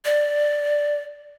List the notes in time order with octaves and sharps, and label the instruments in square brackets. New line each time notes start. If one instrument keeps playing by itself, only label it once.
[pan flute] D5